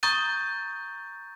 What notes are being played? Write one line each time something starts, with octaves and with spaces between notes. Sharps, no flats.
A#5 C#6 D#6 G6 A6 D#7